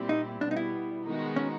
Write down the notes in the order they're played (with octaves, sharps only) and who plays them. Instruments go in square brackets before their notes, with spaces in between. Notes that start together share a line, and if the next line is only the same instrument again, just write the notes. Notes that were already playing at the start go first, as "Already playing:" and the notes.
Already playing: [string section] A#2 G3 C4 E4 G4
[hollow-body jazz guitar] D#4
[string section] B2 G3 B3 [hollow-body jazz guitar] D4
[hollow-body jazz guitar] D#4
E4
[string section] D#3 G#3 B3 D#4 F#4
[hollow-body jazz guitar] C#4